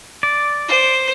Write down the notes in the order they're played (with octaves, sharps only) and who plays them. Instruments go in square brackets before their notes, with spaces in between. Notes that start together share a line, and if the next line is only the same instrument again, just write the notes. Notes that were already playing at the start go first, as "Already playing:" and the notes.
[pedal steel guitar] D5
[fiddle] C5